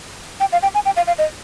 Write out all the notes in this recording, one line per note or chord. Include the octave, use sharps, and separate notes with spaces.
G5
F5
G5
G#5
G5
F5
F5
D#5